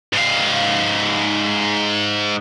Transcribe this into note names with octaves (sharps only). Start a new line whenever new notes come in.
G#2 F5